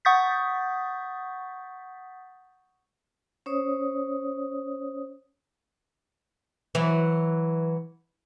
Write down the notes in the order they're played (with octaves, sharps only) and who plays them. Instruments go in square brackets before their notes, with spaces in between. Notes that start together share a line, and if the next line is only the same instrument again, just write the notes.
[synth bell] F#5 C#6 D#6 G6 A6 B6
[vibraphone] C#4 C5 C#5 D#6
[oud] E3 F#3